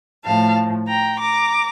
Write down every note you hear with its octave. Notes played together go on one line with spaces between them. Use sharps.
A2 F3 F5 A5
G5 A#5
A#5 D6